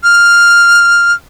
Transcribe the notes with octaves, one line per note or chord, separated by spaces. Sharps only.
F6